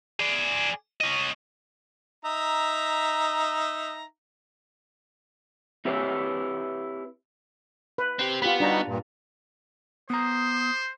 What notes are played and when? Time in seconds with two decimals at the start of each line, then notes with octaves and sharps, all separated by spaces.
0.20 G#4 D5
1.01 C#4 D#5
2.25 D#4 E5 A#5
5.85 C4 E4 G4 B4 C#5 E5
7.98 B4
8.19 C4 G4
8.42 B3 F4 G4 B5
8.60 G3 D4 D#4 F#4 A#5
8.87 G2 A#2
10.10 B3 C5 A#5 D#6